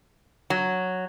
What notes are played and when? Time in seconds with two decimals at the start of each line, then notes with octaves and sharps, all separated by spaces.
0.50 F#3